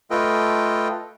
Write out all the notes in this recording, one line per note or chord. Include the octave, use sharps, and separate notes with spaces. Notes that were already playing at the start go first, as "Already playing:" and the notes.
A3 F4 A4 B4 D#5 G5